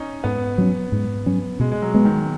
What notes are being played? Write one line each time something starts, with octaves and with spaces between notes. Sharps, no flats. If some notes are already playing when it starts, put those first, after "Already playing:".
Already playing: C#4 D#4
G#2 B3
F#3 C#4
G#2
F#3 C#4
B2 G#3
G#3
F#3
G#3 B3
D#3